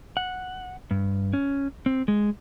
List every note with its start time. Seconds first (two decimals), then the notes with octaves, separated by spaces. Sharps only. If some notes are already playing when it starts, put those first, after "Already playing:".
0.17 F#5
0.91 G2
1.33 C#4
1.86 C4
2.08 G#3